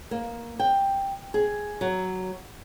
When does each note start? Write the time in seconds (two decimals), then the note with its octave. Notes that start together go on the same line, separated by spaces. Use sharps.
0.11 A#3
0.60 G5
1.34 G#4
1.81 F#3